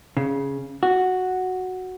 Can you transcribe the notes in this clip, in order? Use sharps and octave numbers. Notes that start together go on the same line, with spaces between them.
C#3
F#4